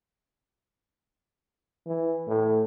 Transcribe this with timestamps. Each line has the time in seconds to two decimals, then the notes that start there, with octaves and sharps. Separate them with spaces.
1.87 E3
2.28 A2